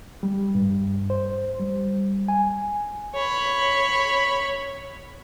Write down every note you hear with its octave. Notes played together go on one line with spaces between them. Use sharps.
G3
G2
C5
G3
G#5
C#5 B5